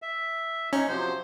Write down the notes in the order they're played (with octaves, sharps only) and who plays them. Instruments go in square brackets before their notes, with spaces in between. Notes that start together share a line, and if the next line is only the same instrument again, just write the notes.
[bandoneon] E5
[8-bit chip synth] C#4 [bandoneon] D#4
[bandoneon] C3 F3 F#3 [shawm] C5